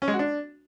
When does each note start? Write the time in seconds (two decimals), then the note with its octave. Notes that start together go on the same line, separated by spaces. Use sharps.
0.02 C#4
0.08 G#3
0.13 F#4
0.19 D4